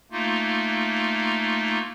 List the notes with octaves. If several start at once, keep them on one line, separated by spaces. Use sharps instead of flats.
A3 A#3 D#4 F4